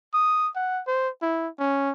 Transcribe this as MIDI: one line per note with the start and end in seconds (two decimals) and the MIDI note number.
0.14 0.48 87
0.55 0.82 78
0.87 1.09 72
1.22 1.48 64
1.59 1.92 61